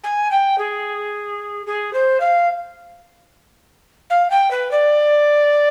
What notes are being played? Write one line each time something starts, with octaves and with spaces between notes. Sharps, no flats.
G#5
G5
G#4
G#4
C5
F5
F5
G5
B4
D5